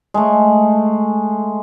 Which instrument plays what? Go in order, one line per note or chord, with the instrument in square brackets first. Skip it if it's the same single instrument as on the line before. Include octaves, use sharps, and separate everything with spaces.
[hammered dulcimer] G#3 A3